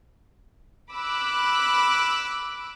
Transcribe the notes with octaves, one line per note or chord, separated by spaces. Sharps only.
B5 D6 E6 F#6